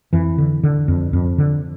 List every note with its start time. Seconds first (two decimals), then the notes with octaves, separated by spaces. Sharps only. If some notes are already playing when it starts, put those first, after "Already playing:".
0.13 F2 E3
0.38 D3
0.63 D3
0.88 F2
1.13 F2
1.38 D3